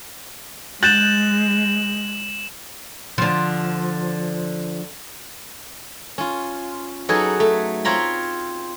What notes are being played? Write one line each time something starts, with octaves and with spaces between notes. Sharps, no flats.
G#3 F#6 G6 A6 E7 F#7
D3 F3
C#4 F4
F#3 D#4 G#4 A4 B4 C#5
A3
C4 F4 C#5 A#5 B5